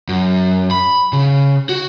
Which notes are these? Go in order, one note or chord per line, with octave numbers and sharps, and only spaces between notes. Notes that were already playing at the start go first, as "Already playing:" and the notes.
F#2
B5
C#3
F#4